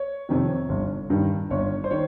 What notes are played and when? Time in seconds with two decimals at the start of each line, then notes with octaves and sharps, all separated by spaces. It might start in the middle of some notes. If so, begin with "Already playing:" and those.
Already playing: C#5
0.29 F2 C3 D#3
0.69 G1
1.10 G2 D#3
1.50 G1 C#5
1.84 C5
1.91 D#3 C#5